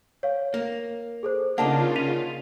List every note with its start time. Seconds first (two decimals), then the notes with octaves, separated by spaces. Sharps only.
0.23 C#5 F5
0.54 A#3
1.23 G#4 A4 C5
1.58 C#3 A#3 D4 D#4 F4 F#5 A5
1.96 B6 D#7 F7